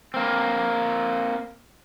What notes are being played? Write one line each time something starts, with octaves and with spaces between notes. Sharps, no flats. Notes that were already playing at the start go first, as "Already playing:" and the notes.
A#3 C4